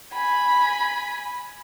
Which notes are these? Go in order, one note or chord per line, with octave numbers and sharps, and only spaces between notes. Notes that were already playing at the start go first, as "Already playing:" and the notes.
G#5 B5